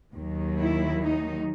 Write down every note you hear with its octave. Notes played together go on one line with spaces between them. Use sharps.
D#2 D#3 F#3
E4
D#4